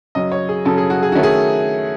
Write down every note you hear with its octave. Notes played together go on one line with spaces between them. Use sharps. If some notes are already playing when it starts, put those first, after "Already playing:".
F#2 C#3 F#3 D#5
C#5
G#4
F#2 C#3 F#3 A4
G#4
F#4
G#4
D#3 A3 C#4 E4 F#4
G#4